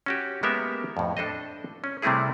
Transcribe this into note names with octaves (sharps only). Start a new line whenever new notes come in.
C#4 F#4 G4
G#3 A#3 B3 G4 A#4 E5
F2 A2
D4 A4 C5 D#5
C#4
C3 G3 A3 C4 E4 G#4